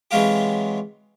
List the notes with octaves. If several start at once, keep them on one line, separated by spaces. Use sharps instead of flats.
C3 E3 F#3 G#3 F4 G4